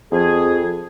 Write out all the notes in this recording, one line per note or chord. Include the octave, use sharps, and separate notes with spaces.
F2 G#4